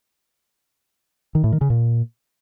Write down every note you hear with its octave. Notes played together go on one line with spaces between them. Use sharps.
D#3
A2
D#3
C#3
A#2